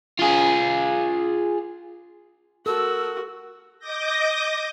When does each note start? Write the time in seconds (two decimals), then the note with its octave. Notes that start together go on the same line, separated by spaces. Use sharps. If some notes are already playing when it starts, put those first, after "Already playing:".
0.19 F4 G#4
2.66 F#4 A4 A#4 E6
3.79 D#5 D6 D#6 G6 A#6